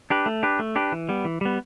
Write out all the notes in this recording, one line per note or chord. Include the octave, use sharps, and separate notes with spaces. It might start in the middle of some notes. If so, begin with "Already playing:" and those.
D4 G4 B4
A3
D4 G4 B4
A3
D4 G4 B4
E3
G3 B3
E3
G3 B3